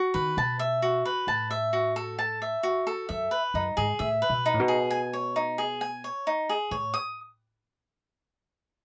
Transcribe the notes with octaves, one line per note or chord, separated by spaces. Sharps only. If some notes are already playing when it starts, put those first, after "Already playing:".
Already playing: F#4
D#3 B4
B2 A5
E5
F#4
B4
A2 A5
E5
F#4
A4
A5
E5
F#4
A4
F#2 E5
B4
F#2 D#4
G#2 G#4
A2 E5
B4
B2
D#4
A2
B2
G#4
G#5
C#5
D#4
G#4
G#5
C#5
D#4
G#4
A2 C#5
D#6